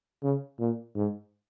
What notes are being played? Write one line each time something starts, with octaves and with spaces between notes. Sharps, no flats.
C#3
A#2
G#2